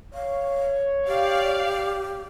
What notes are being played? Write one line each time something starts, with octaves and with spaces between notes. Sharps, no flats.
C#5 F5
G4 D5 F5